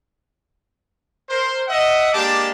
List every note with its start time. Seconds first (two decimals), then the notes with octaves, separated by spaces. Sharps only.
1.28 A#4 C5
1.68 D#5 E5 F#5
2.13 G#3 A#3 D4 G4 A5 D6